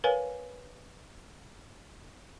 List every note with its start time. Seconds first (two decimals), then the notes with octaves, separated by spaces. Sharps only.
0.04 A#4 B4 C#5 F5 G#5